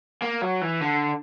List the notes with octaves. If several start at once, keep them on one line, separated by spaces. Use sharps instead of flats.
A#3
F#3
E3
D3